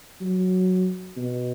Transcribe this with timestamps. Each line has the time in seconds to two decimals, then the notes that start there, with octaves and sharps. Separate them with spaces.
0.21 F#3
1.17 B2